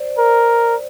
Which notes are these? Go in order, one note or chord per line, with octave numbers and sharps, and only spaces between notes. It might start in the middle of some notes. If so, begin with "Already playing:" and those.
Already playing: C5 D5
A#4